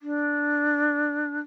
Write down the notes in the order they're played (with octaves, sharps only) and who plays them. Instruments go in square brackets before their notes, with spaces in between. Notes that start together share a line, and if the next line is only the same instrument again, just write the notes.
[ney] D4